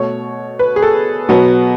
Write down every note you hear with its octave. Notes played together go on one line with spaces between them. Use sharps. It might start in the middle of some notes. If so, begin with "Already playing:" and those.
Already playing: B2 A3 C#5
B4
G#4
A4
B2 F#3 B3